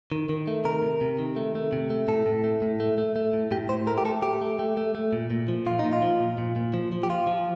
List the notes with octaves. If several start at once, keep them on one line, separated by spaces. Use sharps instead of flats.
D#3
D#3
A3
C3 A#4
C3
C3
D#3
A3
A3
C3
A3
A2 A4
A2
A3
A2
A3
A3
A3
A2
A2 G4
A2 C5
A3 A#4
G4
A3 A4
A3 G4
A3
A3
A3
A3
A#2
A#2
F3
A#2 F4
D#4
A#2
F4
F3
A#2
A#2
A#2
F3
F3
G4
F3 F4
F3